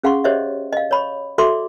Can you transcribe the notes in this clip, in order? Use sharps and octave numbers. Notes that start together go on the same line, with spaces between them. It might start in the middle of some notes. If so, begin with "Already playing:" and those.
C#4 G#4 F5 F#5 C6 C#6
G4 G#4 C5 C#5 D#5 E5
D#5 F5
C#5 B5 C#6
F#4 A4 D5 E5 C6 D6